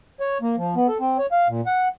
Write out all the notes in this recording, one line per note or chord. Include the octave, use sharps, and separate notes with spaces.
C#5
A#3
F3
B3
A4
C4
C#5
F5
A#2
F#5